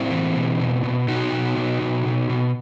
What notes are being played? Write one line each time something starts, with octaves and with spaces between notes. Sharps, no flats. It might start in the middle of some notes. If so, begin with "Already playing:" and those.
Already playing: A2 C4 E4
E3
B2
B2
B2
B2 D#4 F#4
B2
B2
B2
B2
B2